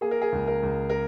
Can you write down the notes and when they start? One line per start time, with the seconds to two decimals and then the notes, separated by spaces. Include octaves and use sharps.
0.01 A#3 G#4
0.11 A#4
0.22 G#4
0.32 C#2
0.47 A#4
0.63 C#2
0.90 A#4